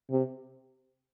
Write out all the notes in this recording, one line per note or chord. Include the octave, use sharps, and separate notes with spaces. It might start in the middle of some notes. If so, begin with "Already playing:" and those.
C3